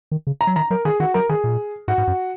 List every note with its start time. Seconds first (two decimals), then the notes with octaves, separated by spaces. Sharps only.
0.12 D#3
0.27 C#3
0.41 A#5
0.47 F#3
0.56 D#3 A#5
0.70 F#3 A#4
0.85 D#3 G#4
1.00 D#3 F#4
1.14 F#3 A#4
1.29 D#3 G#4
1.44 A#2
1.88 G#2 F#4
1.98 G#2
2.07 F#2